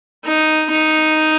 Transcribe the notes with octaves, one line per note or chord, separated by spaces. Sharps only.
D#4
D#4